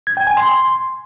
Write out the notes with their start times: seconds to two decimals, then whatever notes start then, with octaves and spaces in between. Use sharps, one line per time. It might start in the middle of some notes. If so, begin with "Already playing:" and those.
0.07 G#6
0.17 G5
0.27 G#5
0.37 C6